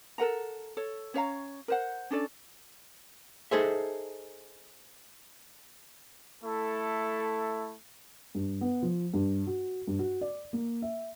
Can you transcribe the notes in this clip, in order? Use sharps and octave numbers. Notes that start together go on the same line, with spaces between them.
A4 A#4 F#5 A#5
A4 C#5
C#4 C#5 F5 A#5
A#4 C5 F#5
C#4 D4 A4 D5
D#4 G#4 A4 C5 E5
A3 E4 A4
G2
B3
F3
G2
F#4
G2
F#4
D5
A#3
E5